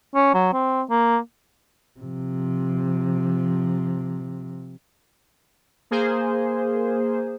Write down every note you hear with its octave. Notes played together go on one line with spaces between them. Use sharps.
C#4
F#3
C4
A#3
C3 F3
A#3 G#4 C5